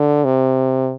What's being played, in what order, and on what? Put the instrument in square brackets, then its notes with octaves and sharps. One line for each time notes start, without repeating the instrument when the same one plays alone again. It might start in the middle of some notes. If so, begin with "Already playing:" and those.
Already playing: [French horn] D3
C3